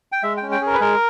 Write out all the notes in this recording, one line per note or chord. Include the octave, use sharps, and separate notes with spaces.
G5
G#3 E5
G5
C#4
G5
G#4 A#4
B4
G#3 A#4